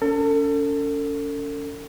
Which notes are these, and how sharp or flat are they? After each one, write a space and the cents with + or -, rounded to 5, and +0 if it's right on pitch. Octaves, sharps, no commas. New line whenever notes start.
C#4 +35 A4 +35